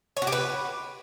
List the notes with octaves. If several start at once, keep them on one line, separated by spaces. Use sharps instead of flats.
C#5
F#4
G4
B4